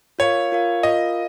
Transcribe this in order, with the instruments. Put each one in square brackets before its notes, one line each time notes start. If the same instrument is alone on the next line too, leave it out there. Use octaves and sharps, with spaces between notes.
[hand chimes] F4 A#4 F5 [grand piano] C#5
[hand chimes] F4 A#4 F5
[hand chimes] F4 A#4 F5 [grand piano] D#5